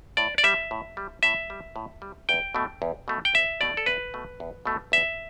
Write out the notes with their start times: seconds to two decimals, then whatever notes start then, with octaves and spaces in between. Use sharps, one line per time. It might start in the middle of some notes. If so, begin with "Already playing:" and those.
0.17 A2 D5
0.38 D5
0.44 G3 E5
0.71 A2
0.97 G3
1.23 A2 E5
1.50 G3
1.76 A2
2.02 G3
2.29 E2 G5
2.54 B2 A3
2.82 E2
3.08 B2 A3
3.25 G5
3.34 E2 E5
3.61 B2 A3 D5
3.77 A4
3.86 E2 B4
4.14 B2 A3
4.40 E2
4.65 B2 A3
4.92 E2 E5